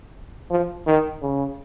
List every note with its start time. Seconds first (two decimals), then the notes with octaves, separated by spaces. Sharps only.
0.51 F3
0.87 D#3
1.22 C#3